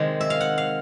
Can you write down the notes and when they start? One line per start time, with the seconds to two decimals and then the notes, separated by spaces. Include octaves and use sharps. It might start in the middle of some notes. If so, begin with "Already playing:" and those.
Already playing: C3 D#3 G#3
0.21 E5
0.30 F5
0.41 F#5
0.58 F5